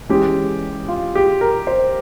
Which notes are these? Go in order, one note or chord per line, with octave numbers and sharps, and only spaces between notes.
E3 G#3 C#4 G4
F4
G4
A#4
C5